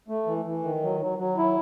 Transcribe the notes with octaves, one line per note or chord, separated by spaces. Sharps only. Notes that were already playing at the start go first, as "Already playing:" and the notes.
A3
E3
E3
D#3
F#3
F#3
F#3
E4